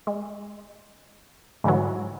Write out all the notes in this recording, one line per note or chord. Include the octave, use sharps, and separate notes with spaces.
G#3
G#2 D3 E3 F#3